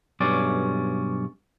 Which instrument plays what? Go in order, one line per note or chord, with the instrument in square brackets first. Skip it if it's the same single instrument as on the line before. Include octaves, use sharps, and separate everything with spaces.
[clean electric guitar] B1 G2 C#4 D5